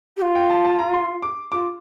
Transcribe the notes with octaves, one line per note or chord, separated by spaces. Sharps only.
G4
F4
G5
A5
A5
A#5
C6
D6
F4 D6